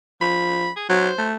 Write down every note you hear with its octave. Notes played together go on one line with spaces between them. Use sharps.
F3 B5
G#4
F#3 C5
A3